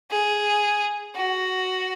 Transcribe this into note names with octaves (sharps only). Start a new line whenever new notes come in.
G#4
F#4